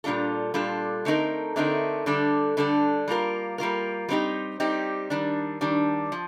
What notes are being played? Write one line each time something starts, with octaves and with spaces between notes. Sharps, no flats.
A#2 G3 D4 F4 A4
A#2 G3 D4 F4 A4
D3 A3 C4 D#4 A#4
D3 A3 C4 D#4 A#4
D3 G3 D4 A4
D3 G3 D4 A4
G3 A#3 F4 A#4
G3 A#3 F4 A#4
G3 C4 D#4 G4
G3 C4 D#4 G4
D#3 G3 D4
D#3 G3 D4
F3